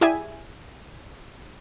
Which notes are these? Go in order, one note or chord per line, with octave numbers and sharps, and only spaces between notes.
E4 G4 G#4 D5 E5 G#5